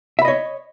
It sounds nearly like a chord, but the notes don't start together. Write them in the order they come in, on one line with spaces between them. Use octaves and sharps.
E5 B5 D#5 C#5